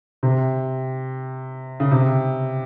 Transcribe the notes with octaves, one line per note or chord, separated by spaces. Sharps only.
C3
C#3
C3